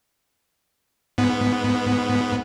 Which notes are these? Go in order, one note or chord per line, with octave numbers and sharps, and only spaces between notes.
G#2 B3